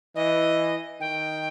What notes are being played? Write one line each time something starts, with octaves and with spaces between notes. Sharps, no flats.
E3 D#5
D#3 G5